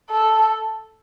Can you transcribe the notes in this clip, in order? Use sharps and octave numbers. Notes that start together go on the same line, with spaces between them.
A4